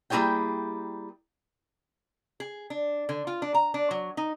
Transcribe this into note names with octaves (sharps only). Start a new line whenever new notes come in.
G3 A#3 E4 G#4 C#5 G5
G#4
D4
D3
F4
D4
A#5
D4
F#3
D#4